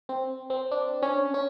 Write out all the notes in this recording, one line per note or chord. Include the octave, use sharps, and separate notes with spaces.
C4
C4
D4
C#4
C#4